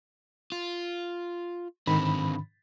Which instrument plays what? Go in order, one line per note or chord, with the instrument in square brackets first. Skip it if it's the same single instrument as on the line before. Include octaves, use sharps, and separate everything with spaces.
[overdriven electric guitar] F4
[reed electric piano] G#2 D#3 B5 [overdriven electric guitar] D3 C4